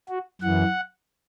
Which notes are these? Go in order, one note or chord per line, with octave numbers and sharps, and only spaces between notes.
F#4
F#2 E3 F#5